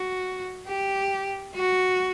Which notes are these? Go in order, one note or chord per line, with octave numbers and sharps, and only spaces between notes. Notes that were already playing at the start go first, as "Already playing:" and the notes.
Already playing: F#4
G4
F#4